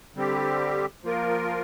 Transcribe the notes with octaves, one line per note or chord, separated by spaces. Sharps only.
D3 G3 C4 G4
F3 A#3 F4 A#4